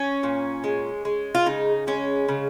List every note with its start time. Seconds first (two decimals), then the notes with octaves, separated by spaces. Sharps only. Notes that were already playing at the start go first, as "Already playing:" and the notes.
Already playing: C#4
0.23 A#2
0.64 G#3
1.05 G#3
1.35 F4
1.46 C#3 D#4
1.87 G#3 C#4
2.29 C#3